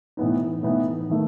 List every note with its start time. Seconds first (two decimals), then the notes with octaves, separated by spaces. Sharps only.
0.17 A2 E3 B3 D#4
0.63 A2 E3 B3 D#4
1.10 D#3 A3